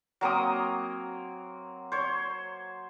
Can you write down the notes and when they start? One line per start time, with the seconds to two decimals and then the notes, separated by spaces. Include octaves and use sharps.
0.21 F#3 A#3 C4 D#6
1.92 C5 C#5